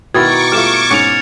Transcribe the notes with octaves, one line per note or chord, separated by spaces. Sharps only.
B2 D#3 E4 A#4 C#6 D6 G#6 A6
G3 A3 F4 F6 E7
G#2 C#4 C#7 F7